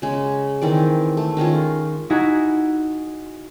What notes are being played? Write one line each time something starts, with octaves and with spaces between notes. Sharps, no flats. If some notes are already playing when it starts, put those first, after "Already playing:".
C#3 G#3
D#3 E3 C4 D5
A3
D#3 G#3 C#4 F4
D#4 E4 F#4 G#4